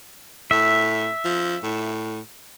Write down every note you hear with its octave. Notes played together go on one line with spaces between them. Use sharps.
A2 E5
F3
A2